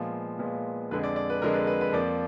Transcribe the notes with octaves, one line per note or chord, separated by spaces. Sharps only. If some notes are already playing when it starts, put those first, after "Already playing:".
Already playing: A#2 F3 G#3 B3
A#2 F3 G#3 B3
F2 D3 G#3 B4
D5
D5
B4
F2 D3 G#3 A#4
B4
B4
B4
F2 F3 A#3 D5